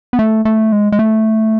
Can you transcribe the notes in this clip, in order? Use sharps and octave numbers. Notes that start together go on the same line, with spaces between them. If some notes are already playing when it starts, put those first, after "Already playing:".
B3
A3
A3
G#3
G#3
A3